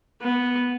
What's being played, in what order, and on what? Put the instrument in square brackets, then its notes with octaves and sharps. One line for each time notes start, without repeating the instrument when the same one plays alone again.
[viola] B3